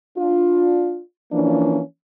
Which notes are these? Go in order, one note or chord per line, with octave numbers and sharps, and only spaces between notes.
D4 F4
E3 F3 A#3 C#4 D4